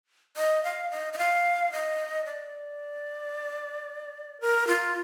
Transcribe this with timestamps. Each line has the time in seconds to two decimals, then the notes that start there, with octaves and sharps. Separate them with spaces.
0.37 D#5
0.64 F5
0.91 D#5
1.13 D#5
1.18 F5
1.72 D#5
2.25 D5
4.41 A#4
4.67 F4